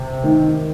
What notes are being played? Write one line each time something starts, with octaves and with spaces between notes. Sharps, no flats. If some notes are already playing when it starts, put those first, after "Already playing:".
Already playing: C3
D#3